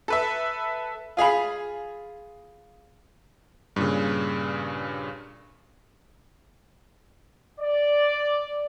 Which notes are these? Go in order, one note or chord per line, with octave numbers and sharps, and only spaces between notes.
A4 B4 E5
F4 G#4 F5 B5
G2 A#2 C#3
D5